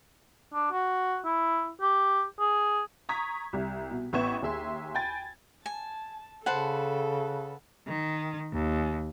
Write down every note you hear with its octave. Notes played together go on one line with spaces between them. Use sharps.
D4
F#4
E4
G4
G#4
A#5 C#6 D#6 G#6 B6
C2 G3
B2
A1 B3 E5 C#6 G#6 E7
D#2 G#4 E5 C6
G5 G#5 B5 G#6 A6
G#5 A5
C#3 A4 B4 C5 F#5 A5
D#3
D#2